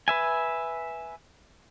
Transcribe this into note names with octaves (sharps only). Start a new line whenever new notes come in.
B4 E5 G#5